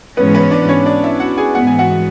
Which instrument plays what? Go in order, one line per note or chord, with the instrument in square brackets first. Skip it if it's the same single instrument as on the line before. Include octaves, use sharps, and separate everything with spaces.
[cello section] G#2 E3 G#3 C#4 [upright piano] B3 B4
[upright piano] B3 B4
D4 D5
C#4 C#5
D4 D5
E4 E5
F#4 F#5
G#4 G#5
[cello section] G#2 E3 B3 [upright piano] F#5
[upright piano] G#5
F#4 F#5